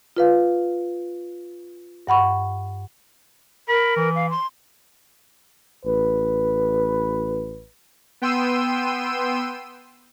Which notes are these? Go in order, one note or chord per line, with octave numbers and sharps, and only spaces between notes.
F4 B4 F5
G2 F#5 B5 C#6
A#4 B5
E3
F5
C6
A1 B4
B3 G5 C6 E6 D#7